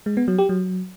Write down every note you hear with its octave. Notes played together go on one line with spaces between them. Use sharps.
G#3
B3
F#3
G4
F#3